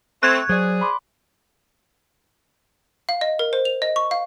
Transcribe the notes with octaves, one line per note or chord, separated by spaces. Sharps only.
A3 C4 C#6 F#6 G#6
F#3 G#4 C5 D5
B5 C6 D6
F5
D#5
A#4
C5
F7
D#5
C#6
F5